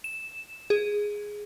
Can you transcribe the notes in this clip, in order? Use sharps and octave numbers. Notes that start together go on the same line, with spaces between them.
E7
G#4